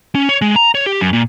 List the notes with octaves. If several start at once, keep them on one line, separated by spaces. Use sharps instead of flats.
C#4
C#5
G#3
A#5
C#5
G4
F#2
A#2